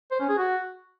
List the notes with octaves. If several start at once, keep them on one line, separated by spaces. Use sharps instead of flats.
C5
C#4
G#4
F#4